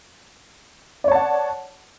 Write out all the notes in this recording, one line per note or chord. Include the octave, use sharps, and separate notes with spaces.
C#5 D5 F#5 A5